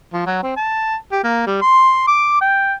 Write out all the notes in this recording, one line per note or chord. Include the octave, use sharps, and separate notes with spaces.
F3
F#3
C4
A5
G4
A#3
G3
C6
D6
G5